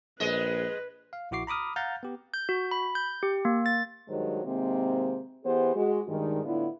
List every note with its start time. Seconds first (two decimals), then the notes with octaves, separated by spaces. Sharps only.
0.20 A#1 G#3 B4 D#5
1.13 F5
1.31 A#1 E4 F#4 D6 C7
1.47 A#5 B5 D6 D#6 F6
1.76 F5 F#5 A#5 F6 G6 A6
2.03 B3 G4
2.34 G6
2.49 F#4
2.71 B5
2.95 G6
3.23 G4
3.45 A#3
3.66 A6
4.08 G2 D#3 F#3 G#3 C5
4.44 C3 D#3 G#3 A#3 C4
5.44 E3 B3 G4 G#4 C5
5.75 G#3 F#4
6.07 G2 D#3 G#3
6.44 A2 D3 B3 D4 E4 F4